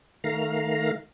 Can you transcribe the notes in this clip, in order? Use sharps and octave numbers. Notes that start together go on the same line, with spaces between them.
D#3 A3 F5 A#5